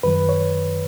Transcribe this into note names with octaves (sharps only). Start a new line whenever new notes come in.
F#2 D#3 F#3 B4
C#5